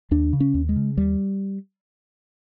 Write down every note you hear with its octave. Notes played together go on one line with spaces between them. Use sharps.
D#2 D4
C#3
C#4
D#2
G#3
C#3
D#2 G3